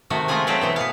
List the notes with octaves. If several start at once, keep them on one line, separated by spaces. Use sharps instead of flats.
C3 D#3 A3 F#4
G#3 A3 D#4 F4 G#4 G#5
F#3 A3 C4 A4 B4
B2 E3 B3
B3 F5